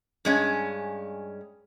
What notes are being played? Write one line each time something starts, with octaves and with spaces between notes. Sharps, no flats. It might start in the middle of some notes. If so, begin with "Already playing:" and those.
G2 G#3 C#4